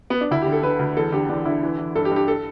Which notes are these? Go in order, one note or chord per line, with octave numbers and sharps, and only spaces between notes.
B3
D4
D2 E4
D3 G4
A4
D3 B4
D2
E2 A4
D3 G4
E2 D4
D3 E4
E3
E3
G2 A4
G4
G2
G4
A4